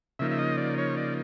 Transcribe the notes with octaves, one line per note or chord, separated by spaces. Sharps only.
C#3 F3 A#3 D#4 E5
E5
D#5
D5
C#5
D5